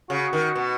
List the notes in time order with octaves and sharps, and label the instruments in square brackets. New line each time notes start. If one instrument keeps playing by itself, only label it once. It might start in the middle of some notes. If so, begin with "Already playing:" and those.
[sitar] C#3 [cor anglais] F#4
[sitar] D#3
B2